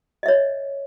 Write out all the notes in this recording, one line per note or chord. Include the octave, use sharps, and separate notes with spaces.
C#5 D#5 E5